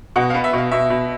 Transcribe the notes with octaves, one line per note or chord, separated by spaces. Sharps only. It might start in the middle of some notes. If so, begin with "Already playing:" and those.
B2 F#5
F5
B3
E5
B2 F5
B2 E5
B2